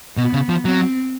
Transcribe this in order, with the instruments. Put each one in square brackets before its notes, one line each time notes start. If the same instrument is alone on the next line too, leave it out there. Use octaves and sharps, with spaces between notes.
[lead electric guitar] B2 [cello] B3
[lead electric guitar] C#3
F3
[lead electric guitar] F#3 [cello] C4